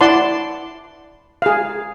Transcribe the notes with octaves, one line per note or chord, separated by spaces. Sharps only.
E4 D5 F#5 A5 C6
G#4 F5